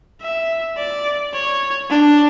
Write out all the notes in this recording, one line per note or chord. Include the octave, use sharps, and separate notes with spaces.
E5
D5
C#5
D4